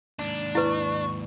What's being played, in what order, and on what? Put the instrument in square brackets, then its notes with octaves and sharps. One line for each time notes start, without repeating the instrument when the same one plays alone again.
[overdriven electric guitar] D#2 G#2 [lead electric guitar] D4
[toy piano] E4 B4 [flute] C#6